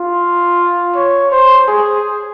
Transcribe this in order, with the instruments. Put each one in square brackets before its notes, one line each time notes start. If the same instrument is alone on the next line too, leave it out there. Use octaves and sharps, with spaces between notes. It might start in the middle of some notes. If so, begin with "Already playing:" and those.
Already playing: [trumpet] F4
C#5
C5
G#4